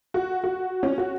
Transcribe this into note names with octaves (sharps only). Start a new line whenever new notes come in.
F#4
F#4
C#4
F#4